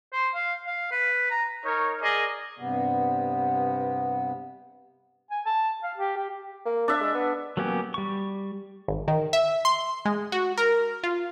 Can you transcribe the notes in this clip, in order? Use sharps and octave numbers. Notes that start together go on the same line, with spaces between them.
C5
F5
F5
B4
A#5
D#4 A#4 C#5
G#4 A#4 D5 D#5
G2 C3 B3
G#5
A5
F5
G4
G4
A#3
D4 E5
G#3
B3
F#3 A#3 B3 C#4 G4
G3 C#6
G#1
D#3
E5
C6
G#3
F#4
A#4
F4